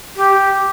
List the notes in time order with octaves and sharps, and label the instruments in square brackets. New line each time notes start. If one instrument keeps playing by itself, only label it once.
[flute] G4